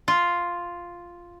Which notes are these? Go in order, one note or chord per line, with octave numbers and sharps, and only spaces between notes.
F4